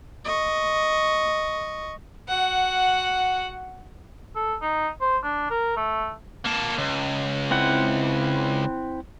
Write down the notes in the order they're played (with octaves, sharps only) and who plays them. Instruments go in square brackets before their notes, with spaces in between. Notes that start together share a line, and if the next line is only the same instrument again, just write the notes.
[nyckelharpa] D#5 C#6
[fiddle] F#4 F#5
[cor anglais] A4
D#4
C5
D4
A#4
A3
[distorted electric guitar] A#3 A4
C#2
[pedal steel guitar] C4 E4 F#5